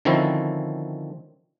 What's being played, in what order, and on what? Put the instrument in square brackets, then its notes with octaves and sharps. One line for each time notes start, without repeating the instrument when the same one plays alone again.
[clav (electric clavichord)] D3 D#3 F3 C4 C#4 E4